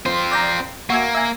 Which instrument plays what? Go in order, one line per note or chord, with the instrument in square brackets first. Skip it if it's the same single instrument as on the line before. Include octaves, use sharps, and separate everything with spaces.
[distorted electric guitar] C4 F4 [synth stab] C5
[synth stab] D5 G5 A#5
[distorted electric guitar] A#3 [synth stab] F#4 E5 G#5
[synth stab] E5 G#5